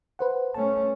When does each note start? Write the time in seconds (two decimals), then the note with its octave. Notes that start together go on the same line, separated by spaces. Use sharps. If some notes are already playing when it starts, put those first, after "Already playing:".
0.19 B4 C5 F#5
0.54 A3 C#4 A5